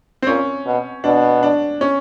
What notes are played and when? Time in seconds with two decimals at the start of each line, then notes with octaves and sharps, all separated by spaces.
0.22 C4
0.27 A#2 C#4
0.66 B2
1.04 B2 D4
1.43 D4
1.81 C#4